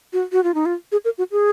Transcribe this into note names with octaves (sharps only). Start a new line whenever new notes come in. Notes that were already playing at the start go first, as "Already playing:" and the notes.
F#4
F#4
F4
D#4
F4
G#4
A#4
F#4
G#4